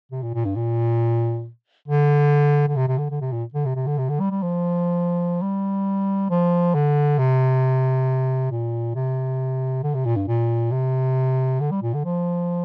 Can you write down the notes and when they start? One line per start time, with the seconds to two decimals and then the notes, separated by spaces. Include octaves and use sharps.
0.12 C3
0.23 A#2
0.34 A#2
0.45 G2
0.56 A#2
1.88 D3
2.68 D3
2.77 C3
2.88 C3
2.98 D3
3.10 D3
3.21 C3
3.32 A#2
3.54 D3
3.66 C3
3.76 C3
3.87 D3
3.98 C3
4.09 D3
4.20 G3
4.31 G3
4.42 F3
5.42 G3
6.30 F3
6.75 D3
7.18 C3
8.51 A#2
8.95 C3
9.83 D3
9.95 C3
10.06 A#2
10.16 G2
10.28 A#2
10.72 C3
11.60 D3
11.71 G3
11.82 A#2
11.94 D3
12.05 F3